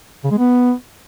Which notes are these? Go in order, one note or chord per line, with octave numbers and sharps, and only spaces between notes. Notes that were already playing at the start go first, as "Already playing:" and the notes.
C#3
G#3
B3